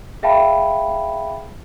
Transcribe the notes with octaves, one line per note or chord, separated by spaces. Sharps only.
G#4 E5 F5 G5 A5 B5